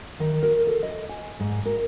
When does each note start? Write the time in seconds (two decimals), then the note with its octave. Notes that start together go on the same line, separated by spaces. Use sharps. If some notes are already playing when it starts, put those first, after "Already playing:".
0.20 D#3
0.43 A#4
0.67 A4
0.83 D#5
1.09 G#5
1.40 G#2
1.66 A#4